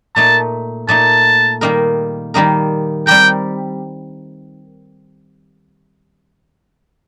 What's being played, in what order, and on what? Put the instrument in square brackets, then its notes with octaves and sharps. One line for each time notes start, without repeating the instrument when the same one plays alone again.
[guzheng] A#2 A3 D#4 [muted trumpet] A5
[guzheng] A#2 A3 D#4 [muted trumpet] A5
[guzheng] D#3 G3 A#3 D#4 A#4
D#3 G3 A#3 D#4 A#4
[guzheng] G3 C4 G4 A#4 [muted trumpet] G5